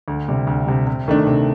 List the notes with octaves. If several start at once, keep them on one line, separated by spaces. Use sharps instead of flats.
D2
C3 G3
D2
C3 G3
C3
D#3 A3 D4
C3